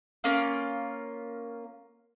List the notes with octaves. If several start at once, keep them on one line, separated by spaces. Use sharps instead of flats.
A#3 C#4 F4